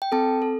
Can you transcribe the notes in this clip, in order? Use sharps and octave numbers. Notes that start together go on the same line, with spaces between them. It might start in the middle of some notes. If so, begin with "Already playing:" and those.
G5
C4 A4 A5
A4